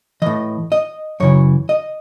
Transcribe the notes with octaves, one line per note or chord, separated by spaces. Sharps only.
A2 E3 D#5
D#5
F#2 C#3 E3 C#5
D#5